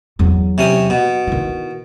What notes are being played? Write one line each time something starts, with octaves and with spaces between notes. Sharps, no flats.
E2 F#3
C3 C#4 D#6
B2
D#3 E4